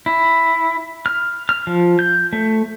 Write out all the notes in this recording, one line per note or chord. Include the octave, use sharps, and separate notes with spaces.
E4
F6
F6
F3
G6
A3